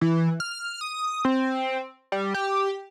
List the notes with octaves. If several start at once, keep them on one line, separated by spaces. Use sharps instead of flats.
E3
F6
D#6
C4
G3
G4